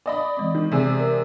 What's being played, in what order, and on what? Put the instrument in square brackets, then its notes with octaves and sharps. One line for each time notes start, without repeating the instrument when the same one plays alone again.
[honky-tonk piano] D5 D#5 B5
[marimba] E3 G#3 C4
[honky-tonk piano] D#3
C3 G#4 D5
[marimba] A#4 C5